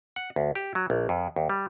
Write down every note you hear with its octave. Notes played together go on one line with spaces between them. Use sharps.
F#5
D2
G4
F#3
A#1
F2
D#2
G3